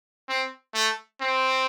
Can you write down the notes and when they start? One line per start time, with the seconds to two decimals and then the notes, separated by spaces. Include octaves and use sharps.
0.29 C4
0.74 A3
1.21 C4